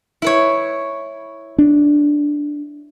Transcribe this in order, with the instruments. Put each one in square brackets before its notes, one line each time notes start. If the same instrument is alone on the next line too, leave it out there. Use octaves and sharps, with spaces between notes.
[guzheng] E4 B4 C#5
[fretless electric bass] D4